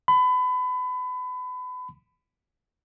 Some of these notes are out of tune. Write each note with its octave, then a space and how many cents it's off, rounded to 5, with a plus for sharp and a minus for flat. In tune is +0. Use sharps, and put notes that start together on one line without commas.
B5 +30